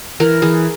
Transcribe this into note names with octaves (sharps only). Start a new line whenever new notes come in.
E3 A#4
E3 G#4